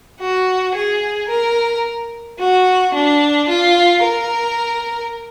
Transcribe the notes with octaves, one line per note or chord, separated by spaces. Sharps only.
F#4
G#4
A#4
F#4
D4
F4
A#4